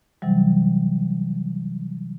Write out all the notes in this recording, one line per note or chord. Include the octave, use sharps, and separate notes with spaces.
C3 E3 F#3 G3